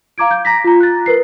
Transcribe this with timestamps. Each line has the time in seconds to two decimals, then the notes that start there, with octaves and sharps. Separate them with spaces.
0.18 F5 A#5 D6 G#6 D7
0.31 G6
0.45 A#5 A#6 B6
0.64 F4 A#5
0.80 F#6 A6
1.06 A#4 B4 C7